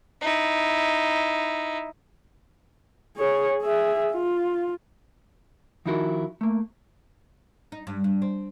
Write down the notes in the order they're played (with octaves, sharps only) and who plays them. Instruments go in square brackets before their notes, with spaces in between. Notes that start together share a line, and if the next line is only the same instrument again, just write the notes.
[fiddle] D#4 E4
[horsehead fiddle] G#4 C#5
G#4 E5
F4
[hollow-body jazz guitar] D#3 F3 D#4 E4 F#4 A#4
A3 A#3
[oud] D#4
G2
G2
C4